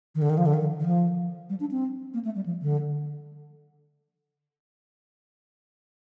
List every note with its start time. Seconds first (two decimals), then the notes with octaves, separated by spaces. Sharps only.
0.15 D#3
0.22 D3
0.30 D#3
0.38 F3
0.46 D3
0.54 D#3
0.80 D#3
0.86 F3
1.49 G3
1.60 D4
1.71 C4
2.14 A#3
2.25 A3
2.35 G3
2.46 F3
2.62 D3